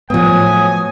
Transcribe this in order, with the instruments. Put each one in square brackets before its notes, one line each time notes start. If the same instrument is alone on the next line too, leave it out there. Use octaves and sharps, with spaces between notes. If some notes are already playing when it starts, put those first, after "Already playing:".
[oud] A2 F#3 [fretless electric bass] F3 B3 [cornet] G#5 [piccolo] D#6